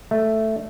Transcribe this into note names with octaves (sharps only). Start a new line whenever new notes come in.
A3